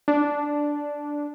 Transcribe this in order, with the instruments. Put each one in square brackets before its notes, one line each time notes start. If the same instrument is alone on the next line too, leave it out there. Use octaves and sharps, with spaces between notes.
[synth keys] D4